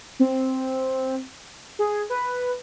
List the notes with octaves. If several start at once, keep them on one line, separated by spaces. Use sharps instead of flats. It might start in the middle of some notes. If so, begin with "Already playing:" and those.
C4
G#4
B4